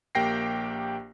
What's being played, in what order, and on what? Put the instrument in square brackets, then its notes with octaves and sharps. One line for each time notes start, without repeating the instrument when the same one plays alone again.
[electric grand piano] A#1 A#3 G4 G5 A#6 C7